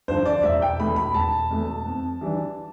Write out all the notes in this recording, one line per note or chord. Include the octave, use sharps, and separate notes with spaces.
G2 D3 F3 C5
D5
E1 E5
G5
E2 B2 A3 B5
B5
E1 A5
E2 B2 A3
F2
E3 G3 D4